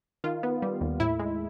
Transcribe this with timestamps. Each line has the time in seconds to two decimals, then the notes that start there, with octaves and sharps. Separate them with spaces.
0.24 D#3 F4
0.43 B3
0.62 G3
0.81 D#2
1.00 A2 E4
1.19 G#3